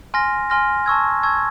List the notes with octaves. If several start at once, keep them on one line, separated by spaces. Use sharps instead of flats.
G#5 C6 F6 A#6
G#5 C6 F6 A#6
A5 C#6 E6 G#6
A5 C#6 E6 G#6